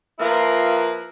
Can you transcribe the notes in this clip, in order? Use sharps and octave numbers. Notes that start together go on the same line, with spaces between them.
F3 A#3 E4 F4 A#4 B4